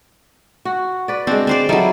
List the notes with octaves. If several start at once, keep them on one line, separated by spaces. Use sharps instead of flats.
F#4
B4 D5
G#3 C4 D4 F#4
C4 C5 D5
F#3 G3 D#4 E4 A4